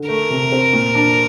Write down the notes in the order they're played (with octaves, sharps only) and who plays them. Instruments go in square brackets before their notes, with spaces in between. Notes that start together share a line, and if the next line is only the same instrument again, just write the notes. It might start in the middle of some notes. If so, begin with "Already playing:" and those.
Already playing: [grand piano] D3
[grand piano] A3 [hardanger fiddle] A#4
[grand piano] C3
C4
A#2
D4